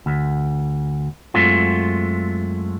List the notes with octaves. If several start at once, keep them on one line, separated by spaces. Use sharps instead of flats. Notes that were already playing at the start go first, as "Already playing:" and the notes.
D2
F#2 G#3 A3 C4 F4